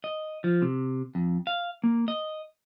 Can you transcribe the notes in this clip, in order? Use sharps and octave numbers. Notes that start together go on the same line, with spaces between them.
D#5
F3
C3
F2
F5
A#3
D#5